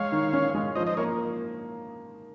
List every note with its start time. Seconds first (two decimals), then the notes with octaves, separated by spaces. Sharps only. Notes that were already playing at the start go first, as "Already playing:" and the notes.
Already playing: G#3 C#5 F5
0.12 D#3
0.33 C#4
0.55 G#3
0.76 F3 C5 D#5
0.87 C5 D#5
0.97 A#3 A#4 C#5